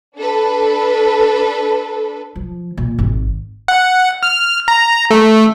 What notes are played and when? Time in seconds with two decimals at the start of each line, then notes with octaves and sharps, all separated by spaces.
0.18 D4 A4 B4
2.36 F3
2.77 A#2
2.99 G#1
3.68 F#5
4.23 F6
4.68 A#5
5.11 A3